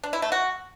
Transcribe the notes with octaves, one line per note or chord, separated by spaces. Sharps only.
D4
E4
A3
F#4